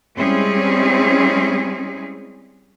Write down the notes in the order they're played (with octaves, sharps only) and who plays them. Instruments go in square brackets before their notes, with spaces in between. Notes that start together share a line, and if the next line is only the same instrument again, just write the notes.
[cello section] G3 G#3 C4 C#4 E4 G#4